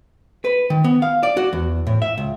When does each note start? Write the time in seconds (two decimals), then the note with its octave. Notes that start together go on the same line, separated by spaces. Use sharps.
0.45 B4
0.70 D#3
0.84 B3
1.02 F5
1.23 D5
1.37 F#4
1.53 E2
1.87 A2
2.02 E5
2.18 C#2